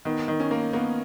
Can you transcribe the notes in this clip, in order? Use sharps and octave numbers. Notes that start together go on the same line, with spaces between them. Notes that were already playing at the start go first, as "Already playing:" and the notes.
D#3 B3
D#3
C#4
A#3
A#3 B3